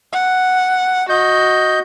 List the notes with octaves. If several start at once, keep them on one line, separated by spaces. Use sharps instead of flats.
F#5
F#4 D#5 G6